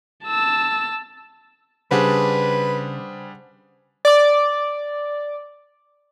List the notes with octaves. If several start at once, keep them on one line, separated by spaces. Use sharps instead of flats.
A5 E6
C#3 G3 D4 G#4 B4 C5 F#5
D5 D6